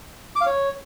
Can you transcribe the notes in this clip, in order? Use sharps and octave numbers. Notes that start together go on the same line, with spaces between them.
D6
F5
C#5